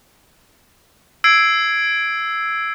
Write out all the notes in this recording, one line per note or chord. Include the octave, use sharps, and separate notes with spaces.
E6 G#6 C7 D7